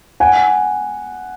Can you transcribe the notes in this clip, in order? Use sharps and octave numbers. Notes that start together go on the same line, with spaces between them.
F#5 G#5